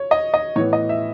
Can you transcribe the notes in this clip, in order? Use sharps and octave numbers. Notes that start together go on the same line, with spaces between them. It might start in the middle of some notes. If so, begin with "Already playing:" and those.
Already playing: C#5
D#5
D#5
A2 E3 B3 C#5
D#5
E5